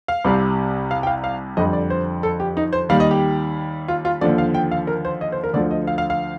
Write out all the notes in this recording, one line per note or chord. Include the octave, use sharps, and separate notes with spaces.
F5
C2 C3 G3
F5
G5
F5
F5
F2 D3 G3 D#5
D5
C5
A4
G4
D#4
C5
D#2 D#3 G3 F5
D#5
G4
F4
F4
D#2 D3 F3 D5
F5
G5
F5
A#4
C5
D#5
C5
A#4
D2 D3 F3 D5
D#5
F5
F5
F5